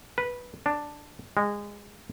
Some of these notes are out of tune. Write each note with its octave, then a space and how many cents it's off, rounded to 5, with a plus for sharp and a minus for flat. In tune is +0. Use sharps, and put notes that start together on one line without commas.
B4 -10
D4 +5
G#3 -20